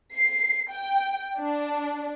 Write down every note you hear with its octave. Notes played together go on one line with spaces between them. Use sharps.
C7
G5
D4